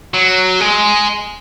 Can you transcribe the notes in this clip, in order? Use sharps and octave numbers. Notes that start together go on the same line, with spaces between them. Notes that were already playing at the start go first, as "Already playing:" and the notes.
F#3
G#3